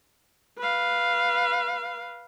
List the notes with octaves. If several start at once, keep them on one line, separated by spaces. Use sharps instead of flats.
B4 F5